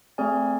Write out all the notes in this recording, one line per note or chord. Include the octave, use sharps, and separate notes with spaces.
A3 C4 G#4 D5 G#5